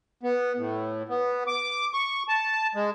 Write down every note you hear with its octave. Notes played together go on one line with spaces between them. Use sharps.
B3
A2
B3
D6
C#6
A5
G#3